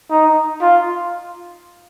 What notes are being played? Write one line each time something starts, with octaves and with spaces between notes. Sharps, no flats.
D#4
F4